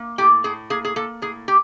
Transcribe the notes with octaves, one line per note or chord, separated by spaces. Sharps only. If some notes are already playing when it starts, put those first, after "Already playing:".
Already playing: A#3
A2 G4
A2 G#4
A#3 G#4
G#4
A#3 A4
A2 G#4
G4